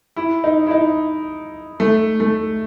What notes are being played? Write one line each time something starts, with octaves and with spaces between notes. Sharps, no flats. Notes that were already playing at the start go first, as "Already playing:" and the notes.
E4
D#4
E4
D#4
A3
A3